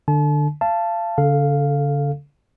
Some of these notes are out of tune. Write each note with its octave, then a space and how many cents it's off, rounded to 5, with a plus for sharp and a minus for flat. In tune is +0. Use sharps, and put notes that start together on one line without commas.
D3 +15 A5 -40
F5 -30 A5 +0
D3 -45 A4 +0 F5 +0